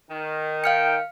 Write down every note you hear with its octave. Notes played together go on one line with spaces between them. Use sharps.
D#3
F5 G5 F6 C#7